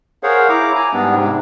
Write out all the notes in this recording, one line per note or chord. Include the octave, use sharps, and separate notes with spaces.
G#4 A#4 C5 C#5 F5 F#5
E4 A#5 D6
G#5 A#5
G#2 G3 B3 D4
G#2 C3